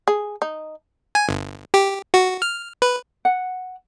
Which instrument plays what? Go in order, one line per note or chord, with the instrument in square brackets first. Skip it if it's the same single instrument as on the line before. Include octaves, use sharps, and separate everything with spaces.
[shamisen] G#4
D#4
[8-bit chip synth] G#5
G1
G4
F#4
F6
B4
[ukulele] F#5